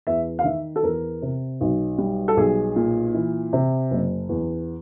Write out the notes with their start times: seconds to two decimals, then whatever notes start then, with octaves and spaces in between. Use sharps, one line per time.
0.07 E2 E5
0.39 F5
0.44 D#3 E5
0.76 A4
0.83 E2 A#4
1.22 C3
1.61 B1
1.98 G3
2.28 A4
2.37 B1 G#4
2.76 A#2
3.14 E3
3.53 C3
3.91 F#1
4.29 E2